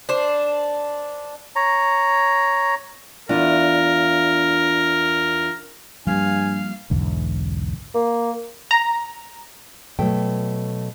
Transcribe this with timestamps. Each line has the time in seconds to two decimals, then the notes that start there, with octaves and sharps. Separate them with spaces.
0.09 D4 C5
1.56 C#5 A#5
3.29 E2 D4 F4 A#4
6.07 G2 F3 G3 A#3 F5 G#5
6.90 B1 E2 G#2 D3
7.95 A#3
8.71 A#5
9.99 B2 F#3 A3 G5